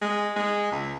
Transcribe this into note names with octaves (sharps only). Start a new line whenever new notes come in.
G#3
G#3
C#2